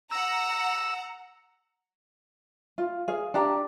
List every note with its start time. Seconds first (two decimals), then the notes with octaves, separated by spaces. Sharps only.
0.11 F#5 A#5 E6
2.78 F4
3.08 G#4 F5
3.34 D4 G4 A#5